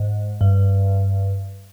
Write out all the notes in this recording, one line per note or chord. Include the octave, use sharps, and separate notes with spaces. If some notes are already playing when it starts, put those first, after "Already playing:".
Already playing: G#2
G2